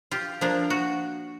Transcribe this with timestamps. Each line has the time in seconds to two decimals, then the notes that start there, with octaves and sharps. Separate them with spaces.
0.11 F4 G4
0.41 F3 A#3 D4 F4
0.70 F#4